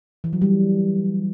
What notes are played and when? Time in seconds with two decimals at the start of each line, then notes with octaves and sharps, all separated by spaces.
0.24 E3
0.33 F#3
0.42 G3